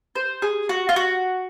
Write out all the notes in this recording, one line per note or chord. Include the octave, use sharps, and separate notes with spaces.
C5
G#4
F#4
F4
F#4